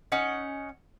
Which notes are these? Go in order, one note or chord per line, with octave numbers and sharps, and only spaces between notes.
C#4 D#4 F#5